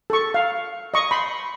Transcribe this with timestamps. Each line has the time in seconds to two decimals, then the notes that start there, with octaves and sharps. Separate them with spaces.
0.10 A4 C#6
0.34 F5
0.94 D#5 C#6
1.11 B5 C6